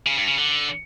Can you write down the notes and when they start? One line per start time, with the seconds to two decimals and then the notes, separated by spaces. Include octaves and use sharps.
0.07 C#3
0.17 G2
0.28 C#3
0.39 D3